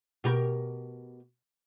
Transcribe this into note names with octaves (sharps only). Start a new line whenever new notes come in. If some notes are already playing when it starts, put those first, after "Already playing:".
B2 G4 A#4